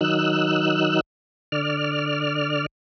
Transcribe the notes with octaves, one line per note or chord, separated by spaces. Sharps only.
D#3 F#3 D#4 E6 F#6
D3 D5 F6